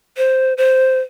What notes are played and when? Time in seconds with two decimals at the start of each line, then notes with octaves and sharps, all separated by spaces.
0.17 C5
0.57 C5